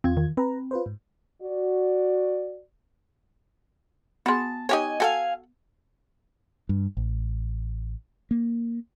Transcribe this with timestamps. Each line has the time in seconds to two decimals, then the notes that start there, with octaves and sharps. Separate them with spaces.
0.04 E2 C4 F4 G#6
0.17 D#3
0.37 C4 B4 A#5
0.71 F4 B4 C5
0.86 G#2
1.42 F#4 D5
4.26 B3 F#4 G#4 A5 C6
4.69 D#4 G4 C#5 D#5 F5 G#5
5.00 F#4 A4 F5 G5 G#5
6.69 G2
6.97 A1
8.31 A#3